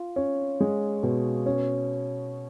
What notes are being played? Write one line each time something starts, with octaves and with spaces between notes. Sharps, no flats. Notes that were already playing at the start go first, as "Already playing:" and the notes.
Already playing: F4
C#4
G#3
B2
C#4